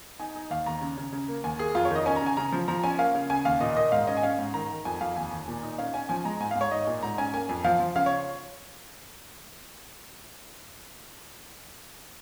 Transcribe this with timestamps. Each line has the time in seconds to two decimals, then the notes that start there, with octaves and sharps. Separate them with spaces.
0.20 D#4 G#5
0.35 D#4
0.50 D#2 F5
0.66 D#2 A#5
0.81 C#3
0.97 C#3
1.13 C#3
1.28 A#3
1.44 D#2 G#5
1.59 A#3 G#4
1.75 F2 F4
1.85 C#5
1.91 D#3 D#5
2.06 C#4 G#5
2.16 A#5
2.21 C#3 G#5
2.37 C#3 A#5
2.52 F3
2.68 F3 A#5
2.84 C#4 G#5
2.99 A#3 F5
3.15 C#3
3.30 C#3 G#5
3.45 D#2 F5
3.61 A#2 D#5
3.76 A#3 D#5
3.92 G#2 F5
4.07 C#4 D#5
4.17 G#5
4.23 C#4 F5
4.38 G#2
4.54 D#3 A#5
4.70 D#3
4.85 F2 G#5
5.01 F2 F5
5.16 D#2 G#5
5.32 D#2
5.48 A#2
5.63 D#4
5.78 C#4 F5
5.94 C#4 G#5
6.09 F3 G#5
6.25 G#3 A#5
6.40 G#2 G#5
6.51 F5
6.55 G#2
6.61 C#5
6.71 D#4 D#5
6.87 A#2
7.03 G#2 A#5
7.18 C#4 G#5
7.33 A#3 G#5
7.49 F2
7.64 F3 F5
7.80 F3
7.96 C#3 F5
8.06 C#5